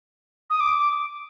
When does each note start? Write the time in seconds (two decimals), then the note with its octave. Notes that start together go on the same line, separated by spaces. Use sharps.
0.50 D#6
0.60 D6